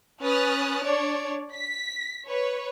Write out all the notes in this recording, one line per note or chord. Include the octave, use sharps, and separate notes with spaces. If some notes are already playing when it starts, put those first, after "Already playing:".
C#4 B4 D#6 F6 F#6 A6
D4 C#5 D5
B6
B4 C#5